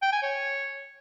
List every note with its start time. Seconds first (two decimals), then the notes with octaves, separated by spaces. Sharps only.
0.02 G5
0.12 G#5
0.23 C#5